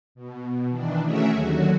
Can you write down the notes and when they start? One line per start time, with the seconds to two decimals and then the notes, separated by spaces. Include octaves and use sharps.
0.15 B2
0.70 D#3 E3 D4
1.02 A3 C#4 F#4 G#4 A#4 E5
1.32 D#2 D3 F#3 F#4